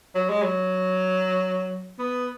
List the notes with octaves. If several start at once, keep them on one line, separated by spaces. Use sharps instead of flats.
F#3
G#3
F#3
B3